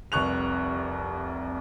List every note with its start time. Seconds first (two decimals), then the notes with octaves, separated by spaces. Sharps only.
0.12 F1 C2 C#6 F#6 F7